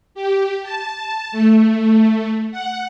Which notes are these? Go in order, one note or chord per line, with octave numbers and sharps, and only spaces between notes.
G4
A5
A3
F#5